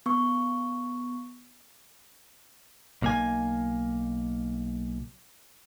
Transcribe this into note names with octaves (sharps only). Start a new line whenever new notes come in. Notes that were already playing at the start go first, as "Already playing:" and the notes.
B3 C#6
B1 A#3 G#5